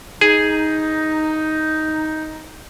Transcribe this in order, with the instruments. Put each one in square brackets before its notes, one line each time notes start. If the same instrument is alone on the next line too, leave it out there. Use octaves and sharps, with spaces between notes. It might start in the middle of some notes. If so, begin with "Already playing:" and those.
[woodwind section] D#4 [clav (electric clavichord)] G#4